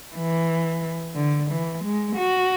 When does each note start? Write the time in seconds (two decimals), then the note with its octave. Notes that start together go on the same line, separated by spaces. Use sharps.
0.15 E3
1.16 D3
1.51 E3
1.84 G#3
2.18 F#4